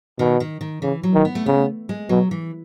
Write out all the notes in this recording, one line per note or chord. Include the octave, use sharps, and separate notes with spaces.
B2 D#3
D#3
D#3
C#3 E3
F#3
D#3
B3
A3
C#3 B3
G#3
B2 F#3
E3